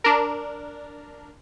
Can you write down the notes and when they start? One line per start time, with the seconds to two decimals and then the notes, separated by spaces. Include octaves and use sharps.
0.04 D4 A#4